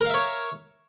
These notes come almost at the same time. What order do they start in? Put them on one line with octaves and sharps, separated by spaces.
A#4 F5 E5 C#5